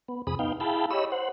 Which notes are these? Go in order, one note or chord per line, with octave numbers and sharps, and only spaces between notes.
B3
F2 C3 G#4 B5 D#6
B3 D#4 F5 G5
E4 G#4 F5 G5 A5 B5
G4 C#5 D#5 B5 E6
C5 F#5